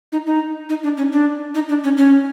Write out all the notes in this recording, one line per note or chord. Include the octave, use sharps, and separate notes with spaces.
D#4
D#4
D#4
D4
C#4
D4
D#4
D4
C#4
C#4